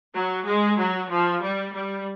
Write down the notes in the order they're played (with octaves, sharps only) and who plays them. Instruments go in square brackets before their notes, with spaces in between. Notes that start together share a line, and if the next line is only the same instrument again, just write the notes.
[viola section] F#3
G#3
F#3
F3
G3
G3